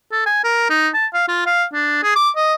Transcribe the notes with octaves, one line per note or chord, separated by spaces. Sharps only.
A4
G#5
A#4
D#4
A5
F5
F4
F5
D4
G#4
D6
D#5